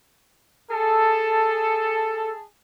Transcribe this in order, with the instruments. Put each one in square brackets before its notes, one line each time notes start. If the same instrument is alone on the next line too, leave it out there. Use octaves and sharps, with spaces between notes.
[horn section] G#4 A5 [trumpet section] A4